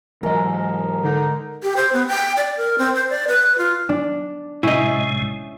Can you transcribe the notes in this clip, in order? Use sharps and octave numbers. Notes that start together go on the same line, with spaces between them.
G#2 E3 F#3 A#4 D#5 A#5
D3 D#4
G4
C5
B3
G5
D5
A#4
C4
C5
D5
B4
F4
D4
A2 C3 G#3 C#4 E4 D#5